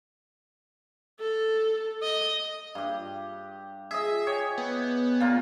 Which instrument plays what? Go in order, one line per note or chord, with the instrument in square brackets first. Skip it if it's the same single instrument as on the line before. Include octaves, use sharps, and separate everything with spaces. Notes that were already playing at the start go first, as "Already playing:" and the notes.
[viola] A4
D#5
[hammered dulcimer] G2 G4
[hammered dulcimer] G#4 D#5 [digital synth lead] E5
[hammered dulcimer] G4 C#5 G#5
[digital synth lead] B3
[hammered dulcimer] A#2 F4 A#5